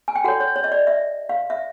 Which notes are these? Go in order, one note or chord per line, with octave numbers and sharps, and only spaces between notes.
G#5
G5
F#4 A4 C#5 F#5
C#5
C#5
D#5
D5
E5
F5
E5